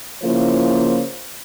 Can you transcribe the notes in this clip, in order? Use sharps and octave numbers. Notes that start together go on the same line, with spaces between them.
C#3 F3 A#3 E4 F4 C5